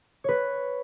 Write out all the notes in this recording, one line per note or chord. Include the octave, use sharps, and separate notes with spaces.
B4 C#5